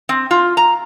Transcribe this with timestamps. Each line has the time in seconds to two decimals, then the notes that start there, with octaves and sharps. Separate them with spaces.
0.09 C4
0.31 F4
0.57 A#5